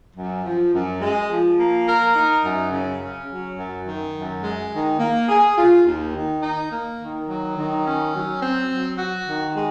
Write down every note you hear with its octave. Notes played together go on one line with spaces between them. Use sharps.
F#2
F3
F#2
G#3
F3
A#3
A#4
D#4
F#2
C#3
C#4
F#3
F#2
D#3
F#2
G#3
D#3
A#3
G#4
F4
D#2
D#3
D#4
A#3
D#3
F#3
D#3
C#4
F#3
C4
F#3
F#4
D#3
G#3